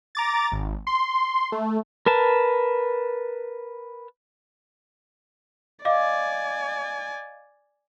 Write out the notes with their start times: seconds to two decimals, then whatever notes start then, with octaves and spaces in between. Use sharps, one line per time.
0.15 A#5 D6 A6
0.52 G#1
0.87 C6
1.52 A3
2.06 A#4 B4 A5
5.85 D5 D#5 F5 G#5 D6